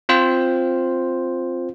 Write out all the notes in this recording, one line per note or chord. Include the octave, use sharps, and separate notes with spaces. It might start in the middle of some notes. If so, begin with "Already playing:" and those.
C4 F4 C5